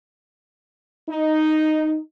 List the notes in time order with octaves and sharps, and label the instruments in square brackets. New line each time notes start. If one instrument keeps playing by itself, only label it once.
[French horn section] D#4